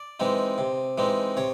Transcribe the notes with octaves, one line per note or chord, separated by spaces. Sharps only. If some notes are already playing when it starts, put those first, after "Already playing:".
Already playing: D5
E3 G#3 C4 D#4
C3
E3 G#3 C4 D#4
C3 C#5